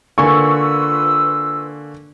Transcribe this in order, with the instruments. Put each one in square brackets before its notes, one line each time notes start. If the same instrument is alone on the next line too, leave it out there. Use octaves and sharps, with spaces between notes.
[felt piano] D3 A#3 G#5 [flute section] F4 B4 E6 [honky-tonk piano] C#6